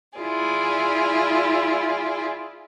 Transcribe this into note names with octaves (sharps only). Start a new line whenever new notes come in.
E4 F4 G#4 D5